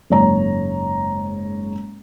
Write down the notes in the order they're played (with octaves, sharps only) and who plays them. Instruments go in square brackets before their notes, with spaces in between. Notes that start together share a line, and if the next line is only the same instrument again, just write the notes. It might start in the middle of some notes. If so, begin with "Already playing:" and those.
[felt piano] F#1 G#2 C#5 A#5